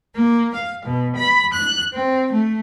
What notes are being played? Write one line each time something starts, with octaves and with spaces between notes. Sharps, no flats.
A#3
F5
B2
B5
F#6
C4
A3